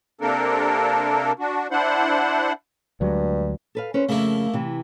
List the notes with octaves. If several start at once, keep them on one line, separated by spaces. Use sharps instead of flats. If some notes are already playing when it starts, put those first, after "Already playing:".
C3 A#3 C4 D4 A4 A#4
D4 F#4
D4 E4 C5 F#5
D2 G2 F#3 G#3
A4 B4 F5
C#4 B4 C5
F2 C#3 A3 A#3 E4
C3 E3